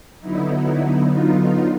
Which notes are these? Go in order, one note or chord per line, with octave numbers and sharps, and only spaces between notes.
D3 F#3 B3 D#4 E4
D#4 F4
D#4 F4